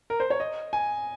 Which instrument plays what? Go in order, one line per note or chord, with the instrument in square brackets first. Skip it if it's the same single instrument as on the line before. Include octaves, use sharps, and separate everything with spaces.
[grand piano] A#4
C5
C#5
D#5
G#5